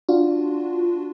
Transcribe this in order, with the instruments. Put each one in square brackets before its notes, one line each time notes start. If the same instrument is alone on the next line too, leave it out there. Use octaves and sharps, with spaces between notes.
[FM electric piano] D4 F4 F#4